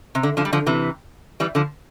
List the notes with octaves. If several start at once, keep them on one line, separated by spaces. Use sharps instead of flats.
C3
D3
D3 F3
G3
D3 F3
C3 E3
E3 G3
D3 F3